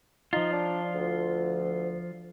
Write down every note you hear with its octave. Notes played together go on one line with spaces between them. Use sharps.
F3 D#4 F4
D4
D2